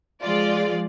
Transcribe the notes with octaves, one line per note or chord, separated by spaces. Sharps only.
F3 G#3 F4 D5